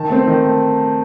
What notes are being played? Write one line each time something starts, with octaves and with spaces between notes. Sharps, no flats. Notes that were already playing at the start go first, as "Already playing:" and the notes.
Already playing: D#3 A5
A3 C4
D#3
A3